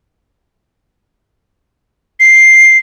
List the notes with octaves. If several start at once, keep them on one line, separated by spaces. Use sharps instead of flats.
C7